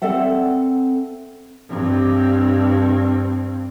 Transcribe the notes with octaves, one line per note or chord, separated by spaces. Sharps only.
C4 A4 D5 E5 F#5
G2 C4